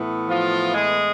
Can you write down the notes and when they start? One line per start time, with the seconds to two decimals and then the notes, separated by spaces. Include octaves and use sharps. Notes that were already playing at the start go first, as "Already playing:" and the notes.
Already playing: A2 E3 B3
0.28 F3 F4
0.74 G#3 G#4